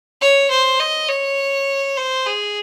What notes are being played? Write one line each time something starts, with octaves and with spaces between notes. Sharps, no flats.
C#5
C5
D#5
C#5
C5
G#4